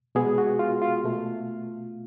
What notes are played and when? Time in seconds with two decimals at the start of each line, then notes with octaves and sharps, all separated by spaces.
0.15 B2 G#3 B3 G#4
0.38 F#4
0.59 F4
0.82 F4
1.04 B2 A3